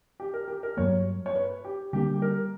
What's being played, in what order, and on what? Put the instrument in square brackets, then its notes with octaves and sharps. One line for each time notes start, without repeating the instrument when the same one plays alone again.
[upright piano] G4
A#4
G4
A#4
[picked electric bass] G2 F#3 A#3 [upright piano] C#5
[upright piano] C#5
B4
G4
[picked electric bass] D3 G3 A#3 [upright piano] G4
[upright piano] G4
A#4